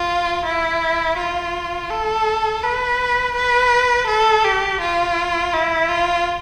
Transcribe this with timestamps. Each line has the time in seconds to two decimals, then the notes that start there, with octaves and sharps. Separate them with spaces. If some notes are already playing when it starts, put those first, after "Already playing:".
Already playing: F4
0.45 E4
1.18 F4
1.90 A4
2.63 B4
3.36 B4
4.07 A4
4.45 G4
4.81 F4
5.53 E4
5.89 F4